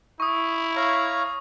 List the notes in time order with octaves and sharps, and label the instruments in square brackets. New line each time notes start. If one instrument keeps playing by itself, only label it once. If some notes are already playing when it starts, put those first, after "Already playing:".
[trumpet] E4 [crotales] C#6 D#6
[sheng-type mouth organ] C#5 F5 A#5